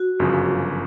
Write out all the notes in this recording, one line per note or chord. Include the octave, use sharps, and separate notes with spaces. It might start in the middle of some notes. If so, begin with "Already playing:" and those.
Already playing: F#4
G1 F#2 C#3 F3